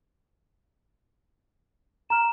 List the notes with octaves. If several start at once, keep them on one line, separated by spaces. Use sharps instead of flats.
A#5 F6 E7